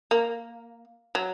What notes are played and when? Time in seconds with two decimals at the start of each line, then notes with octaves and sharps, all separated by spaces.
0.11 A#3
1.15 F#3